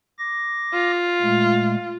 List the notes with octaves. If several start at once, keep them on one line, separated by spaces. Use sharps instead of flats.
D6 A#6
F4
A#2 G#3 A3